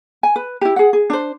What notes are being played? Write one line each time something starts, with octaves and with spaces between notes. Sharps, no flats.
G#5
B4
E4 G4
G#4 F#5
G#4
D4 C5